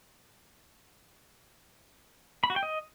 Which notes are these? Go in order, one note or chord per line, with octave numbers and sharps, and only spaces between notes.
B5
F#4
G5
D#5